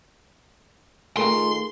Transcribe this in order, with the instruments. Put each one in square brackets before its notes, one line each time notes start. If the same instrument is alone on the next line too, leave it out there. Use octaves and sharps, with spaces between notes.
[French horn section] D#3 F4 G#4 [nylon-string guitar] A3 A#4 [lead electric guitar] C6